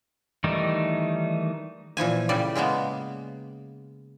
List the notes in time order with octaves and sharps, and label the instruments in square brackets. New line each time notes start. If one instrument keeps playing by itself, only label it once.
[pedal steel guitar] D#3 E3 G3 A3 D#4
[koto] A#2 E3 F3 G#5
A2 C#3 G3 D5
C#3 G#3 A#3 B3